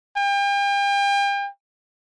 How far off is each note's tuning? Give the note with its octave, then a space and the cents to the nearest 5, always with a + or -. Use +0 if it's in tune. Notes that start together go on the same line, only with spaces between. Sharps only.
G5 +40